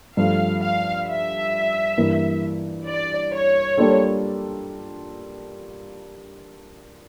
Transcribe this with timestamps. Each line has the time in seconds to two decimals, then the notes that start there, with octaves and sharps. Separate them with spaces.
0.17 G2 F3 A3 F5
0.62 F5
1.07 E5
1.97 G2 E3 A#3 E4 A#4
2.87 D5
3.33 C#5
3.78 G3 A#3 D4 F4 A4